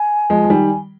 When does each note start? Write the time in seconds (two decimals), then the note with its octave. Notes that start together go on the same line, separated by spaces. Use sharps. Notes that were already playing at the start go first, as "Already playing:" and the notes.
Already playing: G#5
0.30 F3 G#3
0.44 F3
0.50 D#3 G3